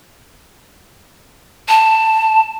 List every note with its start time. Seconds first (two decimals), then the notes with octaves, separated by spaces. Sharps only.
1.69 A5